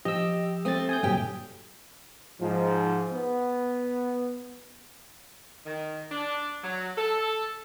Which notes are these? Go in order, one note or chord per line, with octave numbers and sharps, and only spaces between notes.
F3 G4 D#5 E6
A3 C4 D#6 A6
G#5 D#6 G6
G2 A#2 C#3 F#3 G4 G5
G#2 F3
B3
D#3
D4
F#3
A4